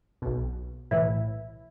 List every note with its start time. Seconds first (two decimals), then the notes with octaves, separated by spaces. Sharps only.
0.22 B1 B2
0.91 B1 A2 E3 E4